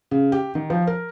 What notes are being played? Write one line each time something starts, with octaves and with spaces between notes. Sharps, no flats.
C#3
G4
D#3
F3
A#4